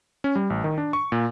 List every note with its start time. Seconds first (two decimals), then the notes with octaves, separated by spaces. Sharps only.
0.24 C#4
0.36 G3
0.50 A1
0.64 D#3
0.78 D4
0.93 C#6
1.12 A#2